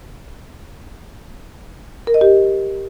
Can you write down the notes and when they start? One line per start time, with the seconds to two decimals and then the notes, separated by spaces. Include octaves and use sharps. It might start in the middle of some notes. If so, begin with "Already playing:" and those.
2.07 A#4
2.14 D#5
2.21 G4